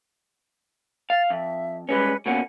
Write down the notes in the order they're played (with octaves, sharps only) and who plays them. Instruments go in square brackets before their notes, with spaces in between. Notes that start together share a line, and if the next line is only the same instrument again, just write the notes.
[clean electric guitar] F5 [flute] A6
[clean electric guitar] F2 [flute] E5
[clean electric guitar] G3 G#3 C#4 [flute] B4
[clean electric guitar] B2 A#3 C#4 [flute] F#5